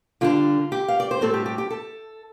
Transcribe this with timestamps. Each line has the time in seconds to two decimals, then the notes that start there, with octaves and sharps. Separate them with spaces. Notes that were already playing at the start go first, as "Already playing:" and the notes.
0.21 D3 G3 D4 F4
0.72 G4
0.88 F5
1.00 D5
1.11 C5
1.21 A2 G3 C4 A4
1.34 G4
1.46 G4
1.58 G4
1.70 A4